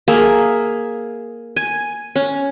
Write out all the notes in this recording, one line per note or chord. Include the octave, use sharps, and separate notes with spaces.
A#3 G#4 E5
G#5
C#4